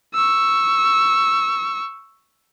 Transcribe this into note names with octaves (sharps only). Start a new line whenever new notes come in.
C#6 E6